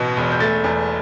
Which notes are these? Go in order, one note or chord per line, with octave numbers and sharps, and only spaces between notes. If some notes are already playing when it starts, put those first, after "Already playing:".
Already playing: A1 B2
E1
G6
A3 A6
E2